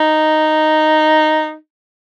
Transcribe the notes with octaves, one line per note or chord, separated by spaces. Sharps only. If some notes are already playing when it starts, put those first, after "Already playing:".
Already playing: D#4